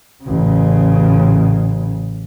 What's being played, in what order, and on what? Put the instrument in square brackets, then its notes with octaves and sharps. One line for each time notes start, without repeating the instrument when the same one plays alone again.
[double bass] A1 C#3